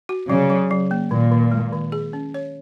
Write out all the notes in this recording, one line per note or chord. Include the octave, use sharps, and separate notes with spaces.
F#4
C#3 F#3
F#3
F#3
A#3
A#2 D#3
D#3
G#3
D#3
G#4
C#4
C#5